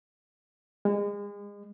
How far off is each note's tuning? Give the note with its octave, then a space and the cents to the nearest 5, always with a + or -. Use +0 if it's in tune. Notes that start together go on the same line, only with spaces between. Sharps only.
G#3 -35